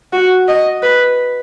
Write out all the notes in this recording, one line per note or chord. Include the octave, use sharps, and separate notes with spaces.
F#4
D#5
B4